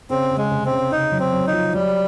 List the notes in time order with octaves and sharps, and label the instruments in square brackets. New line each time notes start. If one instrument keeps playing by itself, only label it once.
[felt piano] C#3 [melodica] C4
[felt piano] C#3
[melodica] G#3
[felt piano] C3
[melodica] C4
[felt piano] C#3
[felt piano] C#3 [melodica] D#4
[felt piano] F#3
[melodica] C4
[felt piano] F#3
[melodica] D#4
[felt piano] F3
[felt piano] F#3 [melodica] G3